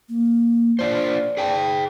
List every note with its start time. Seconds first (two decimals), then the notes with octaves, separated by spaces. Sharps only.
0.09 A#3
0.79 D4 F4 C5 D5
1.37 G#4 G5 A5